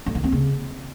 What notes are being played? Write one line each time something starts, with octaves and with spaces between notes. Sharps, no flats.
A3
D#3
C4
C#3